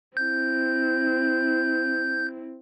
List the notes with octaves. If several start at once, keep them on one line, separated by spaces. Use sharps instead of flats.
C4 E4 G6